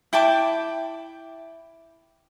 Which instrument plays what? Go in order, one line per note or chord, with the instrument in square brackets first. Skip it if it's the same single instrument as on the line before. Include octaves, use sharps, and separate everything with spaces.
[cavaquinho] E4 G5 A5 D6